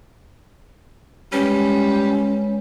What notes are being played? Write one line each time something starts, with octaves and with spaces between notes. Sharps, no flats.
G3 G#3 C#4 B4 C#5